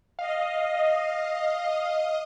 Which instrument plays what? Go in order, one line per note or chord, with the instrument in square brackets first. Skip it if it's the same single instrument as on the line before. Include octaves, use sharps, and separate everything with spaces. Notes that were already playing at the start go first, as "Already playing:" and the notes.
[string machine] D#5 [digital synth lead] F5